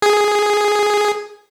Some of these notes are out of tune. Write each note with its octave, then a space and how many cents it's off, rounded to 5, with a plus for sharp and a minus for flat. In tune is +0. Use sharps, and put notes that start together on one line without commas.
G#4 +0